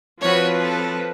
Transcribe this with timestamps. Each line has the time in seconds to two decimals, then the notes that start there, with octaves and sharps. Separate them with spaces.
0.21 F3 C4 F#4 B4 C#5
0.60 A4